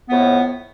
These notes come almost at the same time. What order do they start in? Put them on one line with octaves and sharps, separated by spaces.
B3 F2 A2